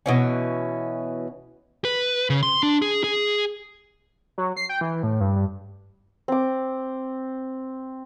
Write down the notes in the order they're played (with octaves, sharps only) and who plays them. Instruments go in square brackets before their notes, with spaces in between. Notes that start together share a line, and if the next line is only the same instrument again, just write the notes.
[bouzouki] B2 E3 C#4
[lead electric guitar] B4
C#3
C6
D4
G#4
G#4
[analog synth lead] F#3
C7
G5
E3
A2
G2
G2
[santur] C4 D6